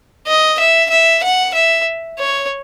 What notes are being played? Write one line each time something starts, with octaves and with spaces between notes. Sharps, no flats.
D#5
E5
E5
F#5
E5
C#5